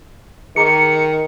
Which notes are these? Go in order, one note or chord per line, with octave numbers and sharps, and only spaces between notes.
D#3 G#4 A#5 D6 C#7